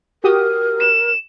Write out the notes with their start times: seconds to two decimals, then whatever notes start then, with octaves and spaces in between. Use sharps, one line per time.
0.24 F#4 G4 A#4 D#6
0.80 E7